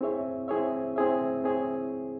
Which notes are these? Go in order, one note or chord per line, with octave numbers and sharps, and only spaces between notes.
C4 E4 G#4 C#5 E5
C4 E4 G#4 C#5 E5
C4 E4 G#4 C#5 E5
C4 E4 G#4 C#5